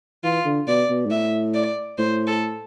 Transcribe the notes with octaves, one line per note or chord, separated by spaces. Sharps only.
E3 F4
D3
B2 D5
B2
G#2
A2 E5
D5
A2 C5
A4